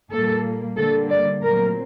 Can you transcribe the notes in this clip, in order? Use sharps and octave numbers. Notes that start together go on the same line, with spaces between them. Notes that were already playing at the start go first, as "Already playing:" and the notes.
A#2 G3 A#3 A4
D3 G3 A#3 A4
D5
A#2 F#3 A3 C4 A#4